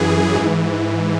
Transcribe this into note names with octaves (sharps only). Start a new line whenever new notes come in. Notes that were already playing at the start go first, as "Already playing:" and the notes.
Already playing: F#2 E3 G#4
G#2 E3